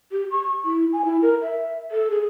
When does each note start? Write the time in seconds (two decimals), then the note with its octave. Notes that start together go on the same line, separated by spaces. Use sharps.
0.12 G4
0.31 C#6
0.65 E4
0.93 G#5
1.05 E4
1.22 A#4
1.42 E5
1.91 A4
2.10 G#4